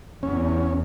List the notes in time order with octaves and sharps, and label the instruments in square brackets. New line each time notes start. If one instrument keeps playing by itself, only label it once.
[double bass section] E2 [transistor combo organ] C#4